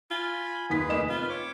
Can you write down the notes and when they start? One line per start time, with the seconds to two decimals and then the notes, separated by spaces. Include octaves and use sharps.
0.11 F4 G#5 B5
0.70 D#2 G#4 B4 B6
0.89 F1 A#3 D#5 E7
1.09 C4 F4 B4
1.29 C#5 D6